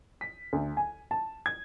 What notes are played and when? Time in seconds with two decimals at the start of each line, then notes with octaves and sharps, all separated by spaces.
0.21 B6
0.53 D2
0.77 G#5
1.11 A5
1.46 G#6